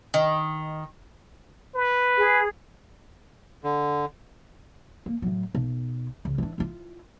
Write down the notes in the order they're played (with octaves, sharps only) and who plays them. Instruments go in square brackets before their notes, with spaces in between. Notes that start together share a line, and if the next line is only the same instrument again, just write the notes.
[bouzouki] D#3
[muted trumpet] B4
[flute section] G#4
[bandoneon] D3
[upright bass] A#3
A2 F#3
B1
C#2
E3 D4
E4 F4